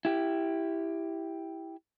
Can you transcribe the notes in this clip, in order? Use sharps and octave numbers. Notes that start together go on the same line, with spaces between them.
E4 G4